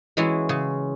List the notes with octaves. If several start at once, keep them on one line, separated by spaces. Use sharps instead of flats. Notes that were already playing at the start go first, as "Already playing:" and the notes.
E3 G#3 C#4 E4 F#4
C#3